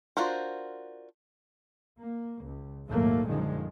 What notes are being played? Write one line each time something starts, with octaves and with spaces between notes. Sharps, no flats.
D4 F4 F#4 A#4 C5
A#3
C#2
A#1 D#2 G#2 F#3 A3 A#3
F#2 D3 D#3 F3 G#3